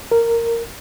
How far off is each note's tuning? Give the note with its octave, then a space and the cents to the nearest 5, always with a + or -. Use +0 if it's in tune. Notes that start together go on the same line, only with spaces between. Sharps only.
A#4 -10